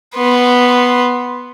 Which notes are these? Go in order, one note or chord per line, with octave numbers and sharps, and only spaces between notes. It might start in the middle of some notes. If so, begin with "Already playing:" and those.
B3 C6